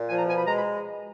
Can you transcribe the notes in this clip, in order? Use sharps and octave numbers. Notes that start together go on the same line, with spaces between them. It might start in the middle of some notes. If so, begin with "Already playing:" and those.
Already playing: A#2
F3 G#5
A#5
B2 G#5
B5
G#3 A#5
B5